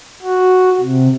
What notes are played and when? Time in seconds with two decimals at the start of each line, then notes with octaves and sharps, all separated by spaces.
0.22 F#4
0.80 C3